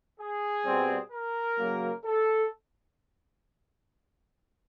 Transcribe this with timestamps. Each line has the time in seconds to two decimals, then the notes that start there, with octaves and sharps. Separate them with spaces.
0.19 G#4
0.66 B2 G3 C4
1.12 A#4
1.59 C#3 F#3 A#3
2.05 A4